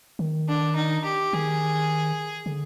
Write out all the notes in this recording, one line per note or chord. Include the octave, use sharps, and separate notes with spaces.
D#3
D4
D#4
G4
D#3 G#4
D3